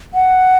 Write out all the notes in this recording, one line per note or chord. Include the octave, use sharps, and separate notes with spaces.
F#5